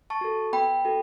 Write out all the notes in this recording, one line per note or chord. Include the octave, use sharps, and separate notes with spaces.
A5 C#6
F#4 A4
B3 G5 B5
F#4 A4